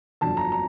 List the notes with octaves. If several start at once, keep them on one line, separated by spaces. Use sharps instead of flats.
G1 F2 D3 F#3 A5
A#5
A#5